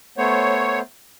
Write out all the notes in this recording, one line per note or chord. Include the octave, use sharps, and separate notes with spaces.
A3 B3 C5 C#5